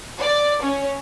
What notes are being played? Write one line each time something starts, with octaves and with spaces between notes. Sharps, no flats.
D5
C#4